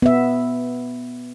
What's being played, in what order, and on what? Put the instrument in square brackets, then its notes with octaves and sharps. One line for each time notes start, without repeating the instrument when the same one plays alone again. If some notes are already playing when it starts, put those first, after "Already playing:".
[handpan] B3 E5